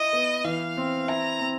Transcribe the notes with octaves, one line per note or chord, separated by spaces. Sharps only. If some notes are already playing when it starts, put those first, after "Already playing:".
Already playing: E4 D#5
B3
E3 F5
C4
E4 A#5
C4